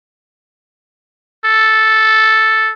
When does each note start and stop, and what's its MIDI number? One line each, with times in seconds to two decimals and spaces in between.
1.46 2.72 69